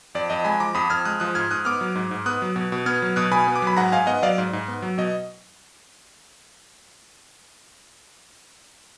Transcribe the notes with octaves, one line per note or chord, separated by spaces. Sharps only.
F2 D5
F2 D#5
G#3 G#5 B5
F3 A#5 D6
F2 B5 D#6
F2 F6 G#6
G#3 D#6 F#6
F3 D#6 F#6
G#2 F6 G#6
G#2 D#6 F#6
B3 D6 F6
F#3
G#2
G#2
B3 D#6 F#6
F#3
B2
B2
B3 F6 G#6
F#3
B2 D#6 F#6
B2 G#5 B5
B3
D6
F#3 B5
G#2 F#5 A#5
G#2 F5 G#5
B3 D#5 F#5
F#3 D5 F5
G#2
G#2
B3
F#3
B2 D#5